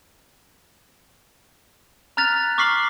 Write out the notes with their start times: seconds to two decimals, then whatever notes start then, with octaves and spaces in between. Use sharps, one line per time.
2.17 A#5 F6 F#6 A6 B6 F7
2.58 C#6 D6 F6 B6 C7 F#7